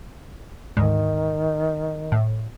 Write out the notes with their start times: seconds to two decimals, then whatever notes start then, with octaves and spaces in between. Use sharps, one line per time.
0.77 D2 G#2 D#3
2.12 A2